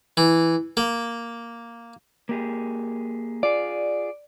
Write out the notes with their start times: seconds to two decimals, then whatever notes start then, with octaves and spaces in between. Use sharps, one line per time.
0.17 E3
0.77 A#3
2.29 A#3 G4 G#4
3.43 F4 G#4 D5